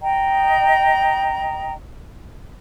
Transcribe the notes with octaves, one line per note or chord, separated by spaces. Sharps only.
D#5 G5 A#5